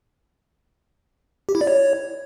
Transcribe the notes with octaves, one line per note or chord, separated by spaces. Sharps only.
G4
E4
D5
C#5